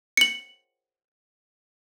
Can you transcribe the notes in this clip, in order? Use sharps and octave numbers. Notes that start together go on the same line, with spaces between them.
C#7 F#7